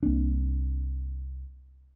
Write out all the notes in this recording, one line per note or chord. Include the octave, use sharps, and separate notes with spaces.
C2 A#3 C4 D4